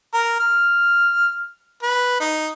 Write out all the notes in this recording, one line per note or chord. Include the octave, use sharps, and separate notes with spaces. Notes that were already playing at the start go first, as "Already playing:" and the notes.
A#4
F6
B4
D#4